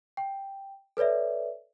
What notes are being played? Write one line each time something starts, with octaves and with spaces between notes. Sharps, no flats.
G5
A4 B4 C#5 D5 E5